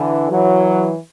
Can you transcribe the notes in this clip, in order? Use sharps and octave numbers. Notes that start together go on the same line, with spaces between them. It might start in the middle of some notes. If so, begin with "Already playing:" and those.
Already playing: D3 E3
E3 F#3